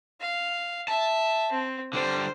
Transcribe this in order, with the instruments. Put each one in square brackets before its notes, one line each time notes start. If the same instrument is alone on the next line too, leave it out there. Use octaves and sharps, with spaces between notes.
[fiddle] F5
[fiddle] E5 [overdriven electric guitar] A5
[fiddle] C4
[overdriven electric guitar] D3 G3 [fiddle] C5